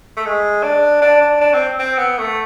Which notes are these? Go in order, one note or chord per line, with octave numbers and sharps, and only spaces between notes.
A3
G#3
D4
D4
D4
D4
C4
C4
B3
A3